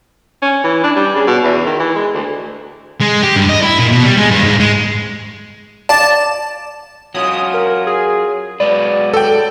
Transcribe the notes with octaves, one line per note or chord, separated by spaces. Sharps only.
C#4
E3
D4
G3
C#3
B2
E2
D#3
E3
G#3
D2
G#3
G4
G2
D#5
E4
A#2
B2
G3
G#3
G2
G#2
G#3
D5 A5
F#3 C#4 F4 D#6
A#4
G#4
F#3 G#3 B4 D5
A4 G5